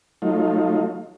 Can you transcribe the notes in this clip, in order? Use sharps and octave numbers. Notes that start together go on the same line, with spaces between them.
F#3 A3 D#4 F4